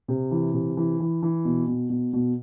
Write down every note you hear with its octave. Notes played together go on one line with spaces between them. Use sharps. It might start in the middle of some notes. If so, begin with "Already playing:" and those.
C3
E3
C3
E3
E3
E3
B2
B2
B2
B2